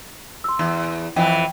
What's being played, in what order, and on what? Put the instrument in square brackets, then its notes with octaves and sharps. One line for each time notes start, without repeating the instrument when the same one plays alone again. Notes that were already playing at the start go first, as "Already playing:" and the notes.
[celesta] C6 E6
[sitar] E2
[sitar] F2 E3 [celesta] G5